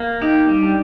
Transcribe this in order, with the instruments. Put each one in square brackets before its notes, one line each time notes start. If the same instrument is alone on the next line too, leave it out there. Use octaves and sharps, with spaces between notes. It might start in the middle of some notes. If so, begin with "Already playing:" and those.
Already playing: [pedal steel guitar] A#3
[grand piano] D#4 [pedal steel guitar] G4
[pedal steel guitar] G3
[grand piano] D4